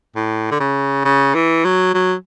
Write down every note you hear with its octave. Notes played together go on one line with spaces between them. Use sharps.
A2
D3
C#3
C#3
E3
F#3
F#3